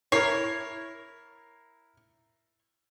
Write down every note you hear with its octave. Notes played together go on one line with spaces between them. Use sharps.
E4 A#4 C#5 C7